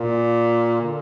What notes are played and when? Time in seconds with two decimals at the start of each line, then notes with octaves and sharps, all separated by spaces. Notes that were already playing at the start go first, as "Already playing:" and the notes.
Already playing: A#2
0.81 D3